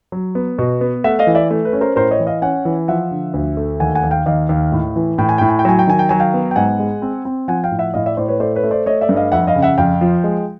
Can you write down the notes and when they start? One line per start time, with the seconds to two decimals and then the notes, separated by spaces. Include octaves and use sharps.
0.12 F#3
0.35 B3
0.59 B2
0.81 B3
1.04 A3 E5 F#5
1.19 D#5 F5
1.27 E3
1.35 D5 E5
1.51 A3
1.65 B4
1.73 C#4
1.81 A#4 C5
1.96 A2 A#4 C5
2.11 C#5 D#5
2.20 E3
2.27 D#5 F5
2.42 C#4 F#5 G#5
2.65 E3
2.88 F3 E5 F#5
3.11 D3
3.34 D2
3.57 A3
3.80 D#2 F#5 G#5
3.95 F#5 G#5
4.03 D#2
4.11 F5 G5
4.26 D#2 D#5 F5
4.49 D#2
4.72 A2
4.96 E3
5.18 A2 G5
5.29 G#5
5.38 A2 G5
5.49 G#5
5.59 G5
5.65 F#3 G#5
5.79 G5
5.87 D#3 G#5
5.99 G5
6.09 F#3 G#5
6.20 F5 G5
6.34 B3
6.51 G5
6.56 G#2 F#5 G#5
6.79 G#3
7.02 C4
7.25 C4
7.48 F3 F#5 G#5
7.64 F5 G5
7.71 A2
7.79 E5 F#5
7.94 A2 D#5 F5
8.06 D5 E5
8.17 A2 C5 D5
8.28 B4 C#5
8.40 A3 C5 D5
8.55 B4 C#5
8.63 A3
8.71 C5 D5
8.86 A3 C#5 D#5
9.01 D5 E5
9.09 G2
9.16 D#5 F5
9.32 F2 E5 F#5
9.47 D#5 F5
9.55 C#3
9.62 E5 F#5
9.78 F2 F5 G5
10.01 F3
10.24 G#3